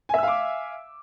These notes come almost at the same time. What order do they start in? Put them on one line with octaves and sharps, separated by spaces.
G#5 E5 E6 F5 D6